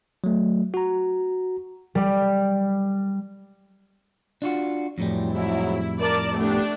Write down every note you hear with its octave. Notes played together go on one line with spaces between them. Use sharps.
F#3 A3
F#4 A#5
G3
D4 F4 F#4
F2 A2 E3 F#3 G3 C4
G#2 F#3 E4
A#4 D5 A5
A3 B3 D4 G4